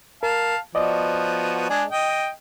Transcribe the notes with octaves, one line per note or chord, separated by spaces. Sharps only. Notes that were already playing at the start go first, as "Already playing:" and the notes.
A#4 F5 A5
F3 B3 F#4 D5 D#5
G#3 D4 G#4
D#5 G5